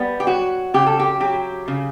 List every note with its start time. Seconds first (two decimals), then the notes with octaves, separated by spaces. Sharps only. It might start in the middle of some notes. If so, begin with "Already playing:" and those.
Already playing: G3 B3
0.20 G4
0.27 F#3 F#4
0.74 C#3 G4
0.86 A4
0.99 G4
1.20 F#3 G4
1.68 C#3